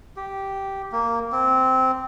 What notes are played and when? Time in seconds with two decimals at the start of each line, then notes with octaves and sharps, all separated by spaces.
0.16 G4
0.92 A#3
1.32 C4